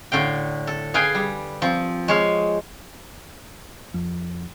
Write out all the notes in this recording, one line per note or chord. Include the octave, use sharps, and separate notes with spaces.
A2 D3 F5 G5
A4
G#4 B4 F5 G5 G#5
G3
F3 C4
G#3 C#5 F5
F2